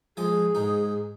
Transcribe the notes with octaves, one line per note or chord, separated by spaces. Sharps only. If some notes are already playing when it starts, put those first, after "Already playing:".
F3 G#3 G#4 D#6
G#2 D#4